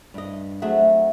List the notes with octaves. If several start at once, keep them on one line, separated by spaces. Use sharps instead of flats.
G2 D#5
F#3 A3 C4 G#4 E5 F#5